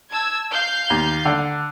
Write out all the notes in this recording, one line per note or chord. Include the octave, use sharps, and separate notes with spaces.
A5 E6 G#6
F5 G6 C7
D#2
D3